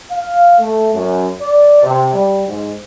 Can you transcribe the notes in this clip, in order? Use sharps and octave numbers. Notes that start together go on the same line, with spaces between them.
F5
A3
F#2
D5
C3
G3
G#2